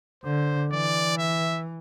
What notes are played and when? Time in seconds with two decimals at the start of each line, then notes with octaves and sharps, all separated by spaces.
0.24 D3 C5
0.71 E3 D5
1.18 E5